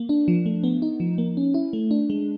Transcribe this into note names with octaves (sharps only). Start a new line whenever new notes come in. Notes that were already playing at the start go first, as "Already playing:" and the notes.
Already playing: A#3
D4
F3
A3
B3
D#4
F3
A#3
C#4
E4
A3
D4
G#3